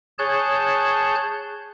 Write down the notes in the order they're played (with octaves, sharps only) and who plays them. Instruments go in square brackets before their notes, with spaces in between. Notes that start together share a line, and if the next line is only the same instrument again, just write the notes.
[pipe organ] G#4 C#5 A5 F#6 G6